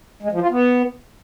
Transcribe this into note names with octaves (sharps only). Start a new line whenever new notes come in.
G#3
F3
F4
B3